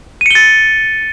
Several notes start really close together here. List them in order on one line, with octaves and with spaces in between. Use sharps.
D#7 C#7 G7 A6